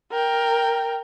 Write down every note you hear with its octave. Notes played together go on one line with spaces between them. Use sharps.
A#4 G5